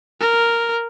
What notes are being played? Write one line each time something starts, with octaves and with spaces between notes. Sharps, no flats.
A#4